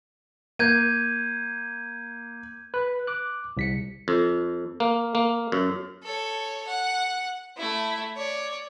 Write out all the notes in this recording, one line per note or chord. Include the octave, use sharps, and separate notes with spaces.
A#3 G6 G#6 D#7
B4
D6 F#6
C2 B6 C#7
F2
A#3
A#3
F#2
A4 C#5
F#5
A3 E4
C#5 D5